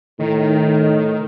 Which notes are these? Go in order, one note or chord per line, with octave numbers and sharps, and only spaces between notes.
A2 D#3